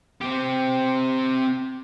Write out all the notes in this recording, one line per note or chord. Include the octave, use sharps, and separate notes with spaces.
C4 G4